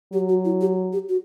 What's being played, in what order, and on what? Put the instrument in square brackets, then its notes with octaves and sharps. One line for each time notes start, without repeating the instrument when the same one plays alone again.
[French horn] F#3 [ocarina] G4
[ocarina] F#4
E4
G4
G4
F#4